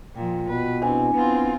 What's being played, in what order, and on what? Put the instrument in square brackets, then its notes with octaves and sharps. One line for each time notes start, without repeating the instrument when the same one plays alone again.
[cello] A#2 F3 [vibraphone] F4 G5
[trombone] B2 [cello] B4
[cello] C4 [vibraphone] D4 E4 [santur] G#5
[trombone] B3 [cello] C4 F4